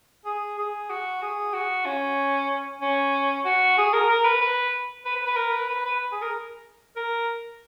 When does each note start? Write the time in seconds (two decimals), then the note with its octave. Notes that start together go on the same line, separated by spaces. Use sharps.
0.25 G#4
0.58 G#4
0.90 F#4
1.22 G#4
1.53 F#4
1.85 C#4
2.82 C#4
3.45 F#4
3.78 G#4
3.93 A#4
4.09 A#4
4.25 B4
4.41 B4
5.05 B4
5.16 B4
5.27 B4
5.37 A#4
5.53 B4
5.69 B4
5.85 B4
6.12 G#4
6.22 A#4
6.97 A#4